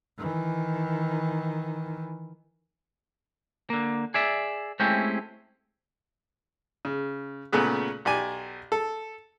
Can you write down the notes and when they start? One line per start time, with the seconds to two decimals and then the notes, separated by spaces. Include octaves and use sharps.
0.18 D#3 E3
3.70 D3 A#3
4.14 G#4 D5 E5
4.80 G#3 A3 C4 C#4 E4 G4
6.85 C#3
7.52 A#2 C#3 A3 B3 G#4
8.05 B1 G4 D5 G#5 D6
8.72 A4